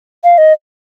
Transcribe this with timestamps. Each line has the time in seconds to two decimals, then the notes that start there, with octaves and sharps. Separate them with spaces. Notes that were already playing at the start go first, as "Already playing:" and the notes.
0.24 F5
0.38 D#5